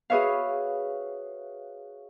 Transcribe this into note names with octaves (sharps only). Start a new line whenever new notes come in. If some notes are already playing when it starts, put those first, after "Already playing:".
F#4 G#4 B4 C#5 E5 F5